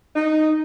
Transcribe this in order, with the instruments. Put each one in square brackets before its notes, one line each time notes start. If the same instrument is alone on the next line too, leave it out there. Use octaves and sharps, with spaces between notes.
[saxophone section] D#4